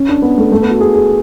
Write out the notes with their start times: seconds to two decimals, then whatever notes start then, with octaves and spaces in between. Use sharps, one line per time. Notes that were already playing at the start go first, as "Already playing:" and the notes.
Already playing: C#4
0.09 D4
0.22 B3
0.37 A3
0.52 A3
0.62 B3
0.71 F#4
0.80 G#4
0.95 G#4